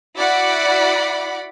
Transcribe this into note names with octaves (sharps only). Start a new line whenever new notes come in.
E4 F#4 D5 F#5 B5 D6